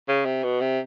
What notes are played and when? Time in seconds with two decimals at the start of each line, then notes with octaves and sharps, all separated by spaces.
0.09 C#3
0.25 C3
0.44 B2
0.61 C3